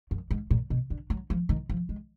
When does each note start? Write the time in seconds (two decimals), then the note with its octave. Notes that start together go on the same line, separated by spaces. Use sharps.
0.11 F#2
0.31 G#2
0.51 A#2
0.70 B2
0.90 D3
1.10 F#3
1.30 F3
1.49 D#3
1.69 F3
1.89 G#3